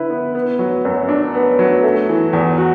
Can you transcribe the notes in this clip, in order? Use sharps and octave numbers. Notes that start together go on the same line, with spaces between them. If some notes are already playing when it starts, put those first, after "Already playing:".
Already playing: D3 E4 B4
B3
B3
F#3
F#2
D4
B3
F#3
A3
E3
E2
F#4